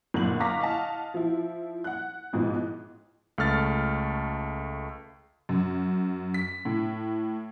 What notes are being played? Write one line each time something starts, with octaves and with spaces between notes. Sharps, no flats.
F#1 A#2 D3 F#7
F5 A#5 C#6 D6 A#6 B6
D#5 F5 F#5 A5
F3 E4
F#5 F#6
A1 G#2 B2 F3
C#2 A3 F6 A6
F#2
B6
A2